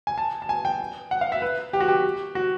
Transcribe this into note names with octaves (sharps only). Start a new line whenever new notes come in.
G#5
A5
A5
G#5
G5
F#5
F5
E5
B4
G4
F#4
G4
F#4